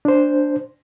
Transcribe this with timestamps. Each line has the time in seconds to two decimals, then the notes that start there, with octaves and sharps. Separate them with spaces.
0.05 D4 C5